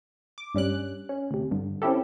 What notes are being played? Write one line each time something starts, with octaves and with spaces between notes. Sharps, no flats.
D6
G2 G3 C#4 F#6
C#4
D2 C3
G2 D3
C4 C#4 E4 G4 A4